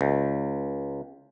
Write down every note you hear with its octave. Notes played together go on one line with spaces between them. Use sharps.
C#2